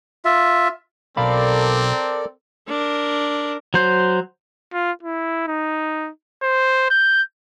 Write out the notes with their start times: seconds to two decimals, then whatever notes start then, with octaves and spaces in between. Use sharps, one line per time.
0.25 F4 E5
1.17 B1 C4 A4 A#4 D5 F5 B5
2.68 D4 A#4
3.74 F#3 C5
4.73 F4
5.03 E4
5.48 D#4
6.43 C5
6.90 G6